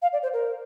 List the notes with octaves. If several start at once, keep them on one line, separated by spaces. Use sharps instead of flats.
F5
D5
C5
A#4